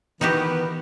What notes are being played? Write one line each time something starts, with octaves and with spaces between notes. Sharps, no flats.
D#3 E3 B3 D#4 F#4 G4 B4